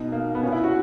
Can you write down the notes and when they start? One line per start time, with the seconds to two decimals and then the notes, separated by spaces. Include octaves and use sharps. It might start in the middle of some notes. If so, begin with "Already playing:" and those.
Already playing: B2 D#4
0.12 A#3
0.35 B3
0.43 A#2 C#4
0.52 E4
0.64 F#4